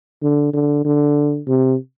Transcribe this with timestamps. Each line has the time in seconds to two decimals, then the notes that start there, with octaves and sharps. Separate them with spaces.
0.22 D3
0.53 D3
0.85 D3
1.47 C3